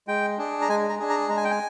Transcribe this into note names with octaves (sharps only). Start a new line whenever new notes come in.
G#3 G5
D4 G#4
A#5
G#3 G#5
A#5
D4 G#4
A#5
G#3 A#5
G#5
G5
G#5